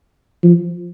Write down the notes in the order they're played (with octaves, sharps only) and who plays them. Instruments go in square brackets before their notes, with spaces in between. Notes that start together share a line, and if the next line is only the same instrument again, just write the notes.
[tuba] F3